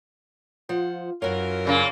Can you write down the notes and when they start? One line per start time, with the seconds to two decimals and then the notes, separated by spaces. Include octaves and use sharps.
0.69 F3 F4 C5 F#5
1.22 F#2 E3 F4 F#4 A#4 C#5
1.65 A#2 C#3 A#3